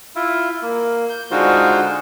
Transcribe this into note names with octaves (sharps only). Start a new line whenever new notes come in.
E4 F4
A#3
G6
D3 G#3 D#4 F4 F#4 C5